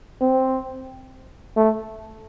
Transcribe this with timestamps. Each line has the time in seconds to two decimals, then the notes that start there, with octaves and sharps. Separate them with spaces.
0.21 C4
1.56 A3